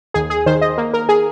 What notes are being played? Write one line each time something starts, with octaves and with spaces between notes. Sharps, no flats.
D#2 G#4
G#4
D#3 C5
D#5
A#3
A#4
G#4